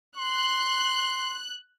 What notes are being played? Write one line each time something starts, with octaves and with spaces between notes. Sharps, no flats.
C6 F#6